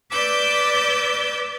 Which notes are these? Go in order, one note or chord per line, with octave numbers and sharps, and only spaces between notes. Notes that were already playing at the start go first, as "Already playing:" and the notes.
B4 D5 D6 E6 G6